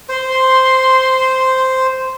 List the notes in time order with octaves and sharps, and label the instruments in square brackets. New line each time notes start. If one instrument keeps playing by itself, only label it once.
[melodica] C5 [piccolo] C6